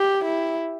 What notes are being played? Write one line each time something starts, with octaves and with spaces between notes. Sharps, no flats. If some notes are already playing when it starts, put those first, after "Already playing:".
Already playing: G4
E4